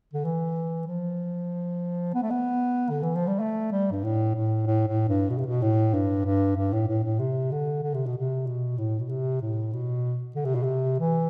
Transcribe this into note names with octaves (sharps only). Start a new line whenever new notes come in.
D3
E3
F3
B3
A3
B3
D3
E3
F3
G3
A3
G3
G2
A2
A2
A2
A2
G2
B2
C3
B2
A2
G2
G2
G2
A2
A2
A2
C3
D3
D3
C3
B2
C3
B2
A2
B2
C3
A2
B2
D3
C3
B2
C3
E3